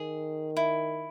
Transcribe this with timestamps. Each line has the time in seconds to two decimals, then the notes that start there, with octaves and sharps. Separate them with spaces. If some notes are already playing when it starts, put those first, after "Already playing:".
Already playing: D#3 G#4
0.57 E4